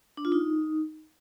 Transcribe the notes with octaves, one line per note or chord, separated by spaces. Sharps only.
D4
F4
D#4